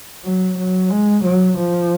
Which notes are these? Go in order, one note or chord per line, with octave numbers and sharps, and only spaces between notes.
F#3
F#3
G#3
F#3
F3